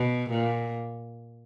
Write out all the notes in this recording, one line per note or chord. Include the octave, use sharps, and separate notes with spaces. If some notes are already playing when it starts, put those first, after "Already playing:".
Already playing: B2
A#2